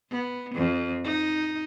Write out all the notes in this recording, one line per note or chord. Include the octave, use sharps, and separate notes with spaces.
B3
F2
D#4